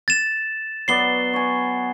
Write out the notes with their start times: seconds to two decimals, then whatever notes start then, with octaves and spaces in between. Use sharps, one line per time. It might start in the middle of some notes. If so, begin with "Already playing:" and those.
0.08 A6 E7
0.88 F#3 B3 D5 C7 G7
1.33 C#5 G#5